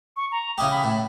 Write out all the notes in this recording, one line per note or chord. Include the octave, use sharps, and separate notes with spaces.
C#6
A#5
C#3 E4 G4 D#6
B5
A2